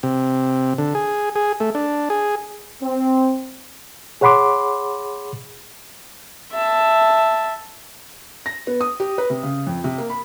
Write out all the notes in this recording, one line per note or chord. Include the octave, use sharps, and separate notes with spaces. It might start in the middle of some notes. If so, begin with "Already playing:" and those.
C3
D3
G#4
G#4
A3
D4
G#4
C4
G#4 C#5 F#5 B5 C6 D6
E5 A5
A#6
B3
D#6
G4
B4
C3
C#3
F2
C3
A#3
B5